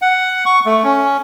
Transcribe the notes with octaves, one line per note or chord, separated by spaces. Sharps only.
F#5
C#6
A3
C#4